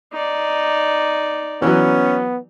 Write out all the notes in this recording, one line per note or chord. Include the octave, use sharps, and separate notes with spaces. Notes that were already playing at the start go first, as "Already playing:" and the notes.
D#4 D5
E3 F#3 B3 C#4